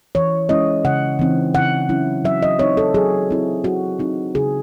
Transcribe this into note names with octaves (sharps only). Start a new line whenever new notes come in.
E3 C#5
G#3 C#4 E4 D#5
C#3 F#5
E3 C4 D#4
C#3 F#5
F#3 C#4 E4
F#3 E5
D#5
C4 D#4 C#5
A4
F#3 G#4
C4 E4
F#3 F#4
C4 D#4
C#3 G#4